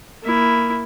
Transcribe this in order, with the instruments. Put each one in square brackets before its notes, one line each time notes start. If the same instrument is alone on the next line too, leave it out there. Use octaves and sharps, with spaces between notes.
[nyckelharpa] A#3 E4